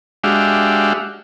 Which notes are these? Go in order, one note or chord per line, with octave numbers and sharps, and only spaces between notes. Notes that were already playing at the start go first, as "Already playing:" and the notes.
G#3 D4 F#4 G4 E5 F5